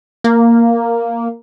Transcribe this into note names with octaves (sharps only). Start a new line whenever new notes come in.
A#3